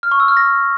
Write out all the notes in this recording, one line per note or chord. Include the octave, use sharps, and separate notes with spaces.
F6
C#6
E6
F6
A#6